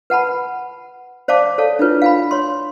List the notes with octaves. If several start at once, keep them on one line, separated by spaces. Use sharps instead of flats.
B4 F#5 A5 B5
C5 D5 F5 A5 D6
A4 C#5 D5 F5 A5
D4 E4 F4 B4 C#5
F5 G#5 B5
C#5 C6